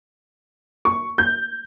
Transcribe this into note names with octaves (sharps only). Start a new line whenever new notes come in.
C#6
G6